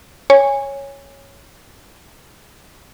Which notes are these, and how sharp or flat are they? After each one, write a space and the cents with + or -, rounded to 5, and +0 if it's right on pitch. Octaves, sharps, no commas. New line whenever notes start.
C#5 +0 G#5 -15